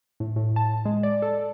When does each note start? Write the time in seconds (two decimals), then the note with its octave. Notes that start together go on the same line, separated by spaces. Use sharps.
0.20 A2
0.36 A2
0.56 A5
0.85 G#3
1.03 D5
1.22 A4